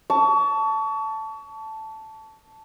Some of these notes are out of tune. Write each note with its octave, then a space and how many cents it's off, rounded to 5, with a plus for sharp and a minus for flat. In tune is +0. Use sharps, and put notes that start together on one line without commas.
A5 +0 C#6 +35